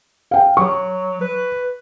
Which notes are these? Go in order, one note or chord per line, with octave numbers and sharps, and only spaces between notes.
F5 G5
F#3 C#6
B4